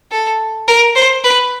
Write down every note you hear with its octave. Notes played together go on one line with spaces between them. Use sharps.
A4
A#4
C5
B4